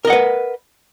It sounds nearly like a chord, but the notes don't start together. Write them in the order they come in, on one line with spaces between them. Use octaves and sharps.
A#4 D#5 F#5 B4